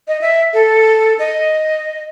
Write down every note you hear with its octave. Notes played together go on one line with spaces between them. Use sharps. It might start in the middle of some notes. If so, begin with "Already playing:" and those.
D#5
E5
A4
D#5